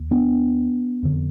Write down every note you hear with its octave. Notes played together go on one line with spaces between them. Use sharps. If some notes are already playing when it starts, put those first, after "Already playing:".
Already playing: D#2
B3 D4
F2 D3